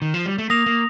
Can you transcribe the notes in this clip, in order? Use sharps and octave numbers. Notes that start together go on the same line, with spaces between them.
D#3
F3
G3
A3
A#3 D#6 A#6 F7
A#3